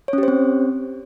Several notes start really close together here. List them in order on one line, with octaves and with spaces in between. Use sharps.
C#5 C#4 G4 C5 C4